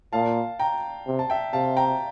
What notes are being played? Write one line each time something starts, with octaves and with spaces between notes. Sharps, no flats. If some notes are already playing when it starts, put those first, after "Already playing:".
A#2 F5 A5
G5 A#5
C3
A5
E5 G5
C3 F5 A5
G5 A#5